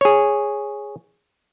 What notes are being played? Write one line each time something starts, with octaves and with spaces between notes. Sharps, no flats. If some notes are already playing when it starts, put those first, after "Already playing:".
G#4 C#5